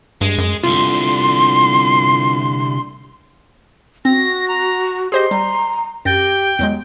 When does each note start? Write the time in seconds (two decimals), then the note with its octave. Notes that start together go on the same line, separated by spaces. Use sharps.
0.21 G2 G#3
0.38 F#2
0.64 C2 D3 F4 C6
4.05 C4 F#4 A#6
4.48 A#5
5.12 G4 G#4 C5 D#5 C6
5.31 G3 A#5
6.05 F#2 G4 G5 A6 A#6
6.59 E2 F#3 G#3